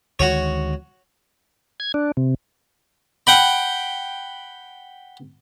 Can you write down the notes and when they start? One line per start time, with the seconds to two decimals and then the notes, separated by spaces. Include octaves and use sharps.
0.19 D2 D#3 G#3 F#4 C#5
1.80 G#6
1.94 D4
2.17 C3
3.27 F#5 G5 B5